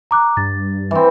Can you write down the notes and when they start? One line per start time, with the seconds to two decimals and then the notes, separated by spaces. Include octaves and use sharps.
0.11 A#5 D6 F#6
0.37 G2 A6
0.91 E3 C4